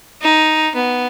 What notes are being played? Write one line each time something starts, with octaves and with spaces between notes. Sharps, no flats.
D#4
B3